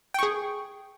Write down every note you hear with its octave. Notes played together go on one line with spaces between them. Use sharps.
G#4 G5 C#6